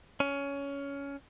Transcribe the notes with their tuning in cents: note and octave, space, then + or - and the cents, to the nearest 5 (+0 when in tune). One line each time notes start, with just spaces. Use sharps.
C#4 +15